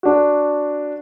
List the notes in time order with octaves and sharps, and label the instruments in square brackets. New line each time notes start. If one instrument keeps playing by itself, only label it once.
[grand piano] D4 F#4